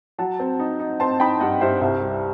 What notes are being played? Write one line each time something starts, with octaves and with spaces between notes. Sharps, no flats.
F#3 F#5 A5
C4
D#4
D#4
C4 A5 C6
D#4 G5 B5
G2 D#5 F#5
G2 C5 E5
C2 C5 E5
G3